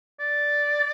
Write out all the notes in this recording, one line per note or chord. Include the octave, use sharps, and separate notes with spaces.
D5